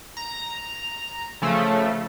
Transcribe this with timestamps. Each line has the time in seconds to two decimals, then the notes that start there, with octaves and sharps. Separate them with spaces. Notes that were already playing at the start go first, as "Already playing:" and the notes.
0.17 A#5
1.42 C#3 F3 A3